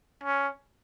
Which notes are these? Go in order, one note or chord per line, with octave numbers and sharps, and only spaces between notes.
C#4